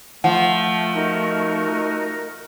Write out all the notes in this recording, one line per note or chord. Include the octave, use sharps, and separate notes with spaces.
F3 A3 F#5
D#4 F#4 A#4